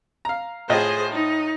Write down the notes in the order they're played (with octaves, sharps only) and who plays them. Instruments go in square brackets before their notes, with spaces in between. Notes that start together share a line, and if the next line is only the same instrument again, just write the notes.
[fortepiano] F5 A#5
[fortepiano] A2 F4 D#5 [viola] G#4 C5
[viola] D#4